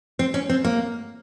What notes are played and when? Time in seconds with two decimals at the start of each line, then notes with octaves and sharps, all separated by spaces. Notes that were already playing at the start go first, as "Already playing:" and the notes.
0.19 C4
0.34 C#4
0.49 C4
0.64 A#3